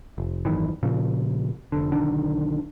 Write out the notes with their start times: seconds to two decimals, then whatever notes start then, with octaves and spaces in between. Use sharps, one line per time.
0.18 F1
0.45 G#1 F#2 D#3 E3
0.83 A#2 C#3 F3
1.72 F1 D3
1.92 B1 D3 D#3 D4